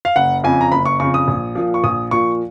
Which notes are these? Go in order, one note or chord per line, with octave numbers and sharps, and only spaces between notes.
F5
F#1 F#5
F2 C#3 G#5
A#5
F#1 B5
C#6
F2 C#3 C#6
D#6
A#1
A#2 F3
C#6
A#1 D#6
A#2 F3 C#6